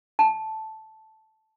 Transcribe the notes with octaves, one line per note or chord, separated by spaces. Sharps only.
A5